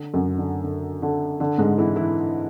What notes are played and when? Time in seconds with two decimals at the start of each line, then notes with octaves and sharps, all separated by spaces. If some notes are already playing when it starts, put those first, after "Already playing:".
Already playing: D3
0.14 F#2 F#3
0.38 D3
0.64 D3
1.02 D3
1.40 D3
1.58 G#2 G#3
1.78 E3 E4
1.96 E3 E4